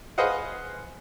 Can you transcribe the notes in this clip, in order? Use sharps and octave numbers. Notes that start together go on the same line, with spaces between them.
G#4 B4 C5 D#5 F5 F#5